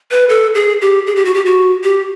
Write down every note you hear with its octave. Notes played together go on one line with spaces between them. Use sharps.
B4
A4
G#4
G4
G#4
G4
F#4
G4
F#4
G4